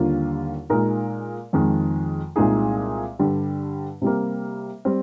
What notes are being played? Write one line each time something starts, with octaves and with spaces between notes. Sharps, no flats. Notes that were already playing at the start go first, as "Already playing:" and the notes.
Already playing: D#2 D3 G3 A#3 F4
A#2 G#3 D#4 A#4
F2 D#3 G#3
C2 A#2 G#3 D#4 G#4
G2 D3 G3
C3 G3 A#3
G3 C4